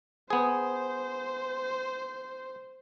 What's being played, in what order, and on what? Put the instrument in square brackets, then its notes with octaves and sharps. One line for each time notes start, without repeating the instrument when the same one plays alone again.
[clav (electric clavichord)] B3 G#4 [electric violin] C5